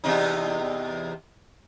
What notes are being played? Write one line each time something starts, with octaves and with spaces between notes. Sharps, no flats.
E2 C3 D#4